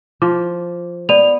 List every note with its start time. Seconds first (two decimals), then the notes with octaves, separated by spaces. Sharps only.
0.22 F3 D6
1.09 B3 D5 D#7 F7